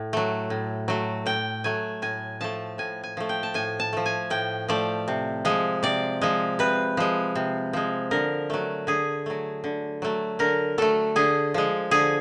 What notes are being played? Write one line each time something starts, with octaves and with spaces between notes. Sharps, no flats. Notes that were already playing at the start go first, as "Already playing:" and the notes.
Already playing: A2
F#3 A3
A2
F#3 A3
A2 G5
F#3 A3 G#5
A2 G#5
F3 A3 A5
A2 G#5
G#5
F3 A3
G5
A5
A2 G#5
A5
F3 A3
G#5
A2 G5
F3 A3 D5
C3
F3 G#3
C3 D5
F3 G#3
C3 B4
F3 G#3
C3
F3 G#3
D3 A#4
F#3 A3
D3 G#4
F#3 A3
D3
F#3 A3
D3 A#4
F#3 A3 A4
D3 G#4
F3 G#3
D3 G#4